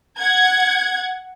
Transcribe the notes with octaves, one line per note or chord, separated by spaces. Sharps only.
F#5 G#6